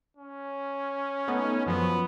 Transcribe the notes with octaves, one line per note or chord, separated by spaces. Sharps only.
C#4
A3 B3 D#4
F#2 F3 F#3 B3